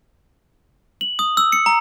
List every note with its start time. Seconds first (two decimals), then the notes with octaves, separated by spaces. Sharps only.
1.01 F#7
1.19 D#6
1.37 E6
1.52 C#7
1.66 A#5